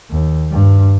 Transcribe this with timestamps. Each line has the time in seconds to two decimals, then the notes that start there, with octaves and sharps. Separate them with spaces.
0.11 D#2
0.51 G2